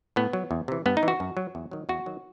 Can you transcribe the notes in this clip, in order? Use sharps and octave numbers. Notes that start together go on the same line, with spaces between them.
A2 B3
F#3
E2
C3 E3
G2 B3
D#4
E3
F#4
F#2
F#3
E2
D#3 F#3
E2 F#4
D#3 F#3